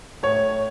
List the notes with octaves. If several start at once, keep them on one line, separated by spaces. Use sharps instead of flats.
A2 C#5